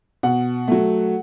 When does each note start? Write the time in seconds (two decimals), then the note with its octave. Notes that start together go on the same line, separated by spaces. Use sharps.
0.23 B2 F#5
0.68 F#3 A3